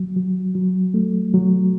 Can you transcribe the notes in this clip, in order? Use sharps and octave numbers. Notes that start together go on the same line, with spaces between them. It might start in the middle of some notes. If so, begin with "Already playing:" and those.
Already playing: F#3
F#3
F#3
A3
F#3